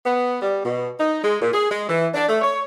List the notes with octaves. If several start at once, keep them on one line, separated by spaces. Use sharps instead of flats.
B3
G3
B2
D#4
G#3
A#2
G#4
G#3
E3
D4
A3
C#5